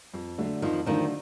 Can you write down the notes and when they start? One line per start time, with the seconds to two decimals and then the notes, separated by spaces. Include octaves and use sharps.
0.14 F2
0.38 D3 F#3 A3 D4
0.62 F2 D#3 F3
0.86 D3 D#3 F3 F#3 A3 D4